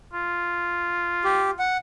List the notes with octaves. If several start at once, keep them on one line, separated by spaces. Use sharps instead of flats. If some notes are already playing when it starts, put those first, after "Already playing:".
F4
G4
F#5